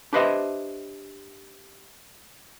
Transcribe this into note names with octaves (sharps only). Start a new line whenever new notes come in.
D4 G4 B4 C5 D#5 E5